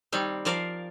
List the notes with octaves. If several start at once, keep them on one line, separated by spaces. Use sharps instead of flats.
D#3 G3 C4
F3 A#4 D5 F5